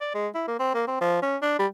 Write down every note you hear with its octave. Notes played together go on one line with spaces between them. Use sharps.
D5
G#3
E4
A#3
C4
A#3
C4
F3
C#4
D4
G3